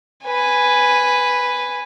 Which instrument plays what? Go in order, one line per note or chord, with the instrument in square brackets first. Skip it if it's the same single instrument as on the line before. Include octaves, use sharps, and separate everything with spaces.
[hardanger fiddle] B4 G#5